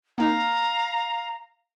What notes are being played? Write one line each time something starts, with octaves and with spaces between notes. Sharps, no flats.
A#3 C4 D#4 F5 A#5